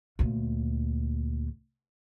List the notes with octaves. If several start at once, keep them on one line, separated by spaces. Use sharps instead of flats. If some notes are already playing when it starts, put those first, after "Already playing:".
D2 A#2